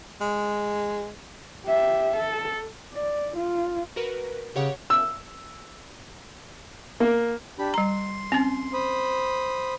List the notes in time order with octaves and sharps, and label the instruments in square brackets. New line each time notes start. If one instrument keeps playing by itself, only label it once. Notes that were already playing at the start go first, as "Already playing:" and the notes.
[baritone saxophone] G#3
[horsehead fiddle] G4 E5
A4
D5
F4
[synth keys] F#4 A#4 B4
[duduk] C#3 [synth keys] G4 C#5 F#5
[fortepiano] E6
A#3
[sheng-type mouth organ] D4 G4 B5
[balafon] G3 A#5 [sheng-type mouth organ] C6
[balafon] C4 C#4
[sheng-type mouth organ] C5 B5 D#6